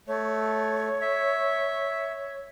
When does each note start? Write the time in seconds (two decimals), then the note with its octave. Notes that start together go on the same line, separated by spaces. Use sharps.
0.08 A3 C#5
1.01 E5